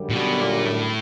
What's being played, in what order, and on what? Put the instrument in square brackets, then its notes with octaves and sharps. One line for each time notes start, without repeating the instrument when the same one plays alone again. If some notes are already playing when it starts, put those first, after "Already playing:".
Already playing: [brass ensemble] F#2 D3 G3
[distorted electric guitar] A#2
B2
A#2
A2